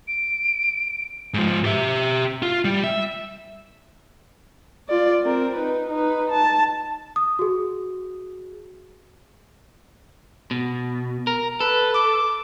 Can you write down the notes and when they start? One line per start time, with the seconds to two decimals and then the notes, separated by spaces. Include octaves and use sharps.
0.08 D7
1.34 G#2 F3
1.64 G4 E5
2.42 F4
2.65 G3
2.84 E5
4.89 F4 D5
5.23 C4 A#4
5.56 D#4 B4
5.90 D#4 B4
6.30 A5
7.16 D#6
7.39 F#4 G#4
10.51 B2
11.27 A#4
11.60 A4 B4
11.94 D6